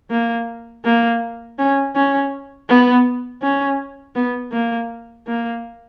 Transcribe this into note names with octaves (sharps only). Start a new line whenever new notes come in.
A#3
A#3
C#4
C#4
B3
C#4
B3
A#3
A#3